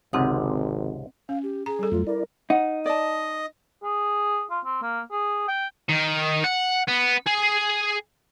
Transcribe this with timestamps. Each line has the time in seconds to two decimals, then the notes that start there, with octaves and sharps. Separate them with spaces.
0.13 G#1 C#2 G#2 C3 C4 F#5 D#6
1.29 C#4 F5
1.43 G4
1.66 G#4 A#5
1.79 G3 A4
1.92 F2 F#3 A3 F4
2.07 E4 A#4 D5
2.50 D#4 F#5
2.86 D5 D#5 A5
3.83 G#4
4.51 F4
4.65 C4
4.82 A#3
5.11 G#4
5.48 G5
5.89 D#3
6.44 F#5
6.88 B3
7.27 G#4